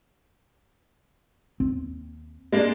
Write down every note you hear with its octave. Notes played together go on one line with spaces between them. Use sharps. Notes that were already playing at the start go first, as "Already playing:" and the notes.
D#2 C4
G#3 A#3 D4